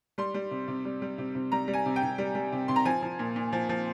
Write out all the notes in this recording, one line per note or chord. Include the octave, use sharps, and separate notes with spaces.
G3 C6
G3
C3
C3
G3
G3
C3
C3
G3 A#5
G3
G#5
C3
G5
C3
G3
G3
C3
C3 C6
A#5
F3 G#5
F3
A#2
A#2
F3
F3